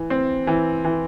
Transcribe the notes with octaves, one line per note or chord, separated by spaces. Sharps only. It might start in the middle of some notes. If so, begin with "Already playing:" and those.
Already playing: E3
C4
E3
E3